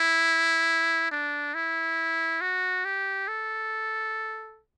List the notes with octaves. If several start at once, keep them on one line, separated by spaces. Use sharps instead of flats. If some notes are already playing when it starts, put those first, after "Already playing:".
Already playing: E4
D4
E4
F#4
G4
A4